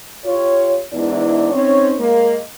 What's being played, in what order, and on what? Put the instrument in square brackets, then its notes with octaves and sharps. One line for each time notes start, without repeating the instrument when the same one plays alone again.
[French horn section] F4 G4 C#5
E2 G#2 E3 D4
C4 C#4 D#4 C5 C#5
G#3 A#3